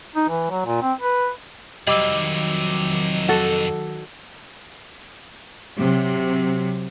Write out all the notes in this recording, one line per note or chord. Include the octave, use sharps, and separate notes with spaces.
D#4
E3
F#3
A#2
C4
B4
F2 C3 D#3 F#3 G3 D#5 D6 E6
F#4 A4
C3 F#3